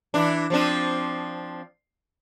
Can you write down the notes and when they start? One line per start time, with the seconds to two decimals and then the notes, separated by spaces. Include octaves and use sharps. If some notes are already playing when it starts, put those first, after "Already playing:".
0.14 E3 D4
0.50 F3 C4 D4